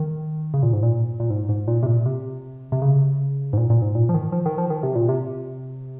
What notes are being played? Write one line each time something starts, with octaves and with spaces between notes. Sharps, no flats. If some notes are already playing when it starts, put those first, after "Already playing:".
Already playing: D#3
C#3
A#2
G#2
A#2
A#2
G#2
G#2
A#2
C3
A#2
C3
C3
C#3
G#2
A#2
A#2
G#2
A#2
F3
D#3
F3
D#3
F3
D#3
C3
A#2
C3